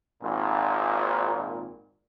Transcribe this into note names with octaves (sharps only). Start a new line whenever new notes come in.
G#1 A#2